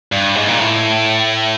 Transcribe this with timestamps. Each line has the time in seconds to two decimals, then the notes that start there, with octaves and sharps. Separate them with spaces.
0.12 G2
0.35 G#2
0.48 A#2
0.59 A2